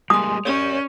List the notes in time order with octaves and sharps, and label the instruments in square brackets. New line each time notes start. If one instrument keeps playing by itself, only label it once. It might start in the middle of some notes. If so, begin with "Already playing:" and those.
[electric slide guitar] G3 G#3 A#3 [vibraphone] G#5 C6 [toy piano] D#6
[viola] C#4 [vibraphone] G4 D5 [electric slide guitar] A#4 C#5